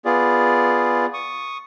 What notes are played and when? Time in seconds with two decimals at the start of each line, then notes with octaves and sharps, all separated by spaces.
0.05 B3 F4 G#4 D5
1.14 C#6 D#6